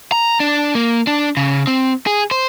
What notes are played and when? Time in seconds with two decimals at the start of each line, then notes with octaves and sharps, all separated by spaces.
0.12 A#5
0.40 D4
0.75 A#3
1.07 D4
1.37 C#3
1.67 C4
2.07 G#4
2.31 C5